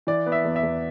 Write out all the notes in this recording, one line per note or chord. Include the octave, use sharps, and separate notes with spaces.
E3 D5
B3
E5
E2
E5
E2